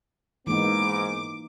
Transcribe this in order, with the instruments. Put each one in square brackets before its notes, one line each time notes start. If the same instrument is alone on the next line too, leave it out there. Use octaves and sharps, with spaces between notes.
[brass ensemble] G#2 B3 [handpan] E3 A#3 D#4 [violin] D6